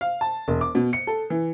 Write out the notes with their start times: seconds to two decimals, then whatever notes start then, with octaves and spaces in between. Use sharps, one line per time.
0.01 F5
0.21 A5
0.48 E1
0.61 D6
0.75 B2
0.93 C#7
1.07 A4
1.30 E3